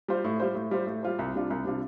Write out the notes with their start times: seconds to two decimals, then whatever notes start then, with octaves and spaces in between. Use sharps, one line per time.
0.08 G3 F4 C5
0.24 A2
0.40 G3 F4 C5
0.55 A2
0.71 G3 F4 C5
0.86 A2
1.03 G3 F4 C5
1.19 C2
1.34 C3 G3 D4 F4
1.50 C2
1.65 C3 G3 D4 F4